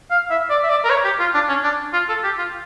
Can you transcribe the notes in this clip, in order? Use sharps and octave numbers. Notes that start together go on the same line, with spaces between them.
F5
E5
D5
E5
D5
A#4
C#5
G4
F4
D4
C#4
D4
F4
A4
G4
F4